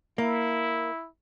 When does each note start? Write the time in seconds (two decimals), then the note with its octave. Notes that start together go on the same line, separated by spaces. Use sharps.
0.18 A#3 E4